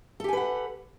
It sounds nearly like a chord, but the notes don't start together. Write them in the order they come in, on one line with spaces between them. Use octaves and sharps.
A4 G4 G#5 B4 F#5